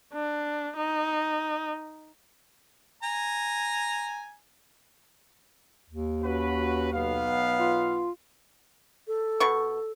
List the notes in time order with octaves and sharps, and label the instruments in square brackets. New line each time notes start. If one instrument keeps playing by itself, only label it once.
[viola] D4
D#4
[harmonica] G#5 A#5
[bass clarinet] D#2
[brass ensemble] C#4 F#4 B4
B1 B3 F5
[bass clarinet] F4
[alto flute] A4
[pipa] B2 C#6